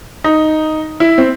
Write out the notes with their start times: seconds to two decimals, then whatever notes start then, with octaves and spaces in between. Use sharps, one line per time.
0.24 D#4
1.00 E4
1.18 C4